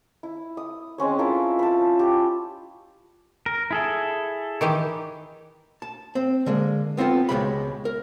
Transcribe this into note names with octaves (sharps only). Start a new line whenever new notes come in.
E4
D#6
G#3 C4 C#4 C#5
E4 F4 A4 A#4
A5 B5
G4
A#4
E4 G#4 A4
D#3 E3 G4
A5
C4
D3 G#3 A#3
B3 C4 D#4 F4 A4
C#2 G2 B2 G#3 G4 B5
A#4